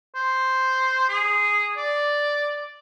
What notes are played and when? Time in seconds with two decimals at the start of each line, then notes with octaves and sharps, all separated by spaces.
0.15 C5
1.09 G#4
1.77 D5